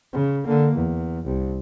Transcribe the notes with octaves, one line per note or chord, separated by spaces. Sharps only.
C#3
D3 A#3
E2
C2